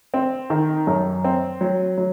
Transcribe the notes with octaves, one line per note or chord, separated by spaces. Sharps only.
C4
D#3
F#2
C4
F#3
F#3